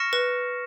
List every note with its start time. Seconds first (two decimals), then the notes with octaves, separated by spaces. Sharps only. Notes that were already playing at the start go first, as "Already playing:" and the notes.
Already playing: C#6 F6 A#6 C#7 E7
0.13 B4